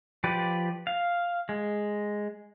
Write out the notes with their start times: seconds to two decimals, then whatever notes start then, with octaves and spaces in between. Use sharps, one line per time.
0.24 F3 G4 B4 D5
0.87 F5
1.49 G#3